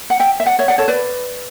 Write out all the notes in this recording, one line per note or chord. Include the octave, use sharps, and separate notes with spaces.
F#5
E5 G5
E5
D5 F#5
C#5 E5
D5 F#5
A4 C#5
B4 D5